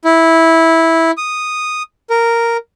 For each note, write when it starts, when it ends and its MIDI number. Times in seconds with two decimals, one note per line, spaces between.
0.05 1.11 64
1.17 1.83 87
2.10 2.57 70